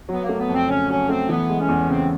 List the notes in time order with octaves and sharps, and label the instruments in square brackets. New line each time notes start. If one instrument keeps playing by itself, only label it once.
[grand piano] F#3 [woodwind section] B3
[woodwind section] A#3
[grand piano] A3
[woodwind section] B3
[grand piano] F2
[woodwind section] C4
[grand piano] C#3 [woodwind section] C#4
[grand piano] F#3 [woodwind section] C#4
[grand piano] A3 [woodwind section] C4
[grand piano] E3 [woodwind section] B3
[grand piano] G#3
[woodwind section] C#4
[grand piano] E2
[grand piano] C#3 [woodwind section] C4